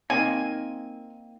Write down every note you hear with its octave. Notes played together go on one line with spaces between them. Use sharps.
A#3 C4 D#4 G#5